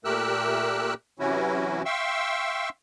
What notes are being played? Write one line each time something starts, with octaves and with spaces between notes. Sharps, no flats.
A#2 A3 G4 A#4 E6 F#6
C3 E3 F#3 C#4 E4 F#4
E5 F5 G5 C6 C#6 E6